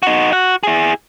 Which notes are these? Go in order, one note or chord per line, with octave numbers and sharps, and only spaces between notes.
D#4 F#4
F#4 F#5
E4 G#4